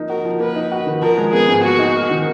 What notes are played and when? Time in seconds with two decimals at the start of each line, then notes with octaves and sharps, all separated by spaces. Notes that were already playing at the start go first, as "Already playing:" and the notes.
Already playing: F3 A#3 D#4
0.09 F#4 A#4
0.25 F3
0.40 A#3 B4
0.56 D#4
0.71 F#4
0.87 D#3
1.02 F3 A#4
1.18 G#3
1.33 B3 G#4
1.48 G#2
1.63 A#3 F#4
1.79 D#4
1.96 A#4
2.11 D#3